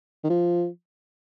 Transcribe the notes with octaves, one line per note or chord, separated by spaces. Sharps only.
D#3
F3